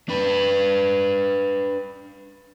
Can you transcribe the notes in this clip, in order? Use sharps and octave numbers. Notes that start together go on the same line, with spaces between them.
D4 B4